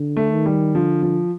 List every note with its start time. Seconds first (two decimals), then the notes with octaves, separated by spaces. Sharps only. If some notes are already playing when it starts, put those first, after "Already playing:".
Already playing: D3
0.17 A3
0.31 D#3
0.46 G3
0.75 D3 F3
1.03 F3